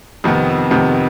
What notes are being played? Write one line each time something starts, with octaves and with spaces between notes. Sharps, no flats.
F2 C3 D#3 B3
F2 C3 D#3 B3